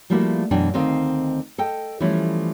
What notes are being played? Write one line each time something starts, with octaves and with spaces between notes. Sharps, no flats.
F3 G3 A3 A#3 E4 F#4
F#2 B2 E3 D4 G5
D2 D#3 C4 D#5 F5
A4 D#5 G5
E3 F3 G3 A3 C#4 E4